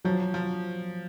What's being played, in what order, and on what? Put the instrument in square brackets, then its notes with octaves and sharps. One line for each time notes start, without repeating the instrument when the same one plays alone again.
[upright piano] F3 [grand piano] F#3
[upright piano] F3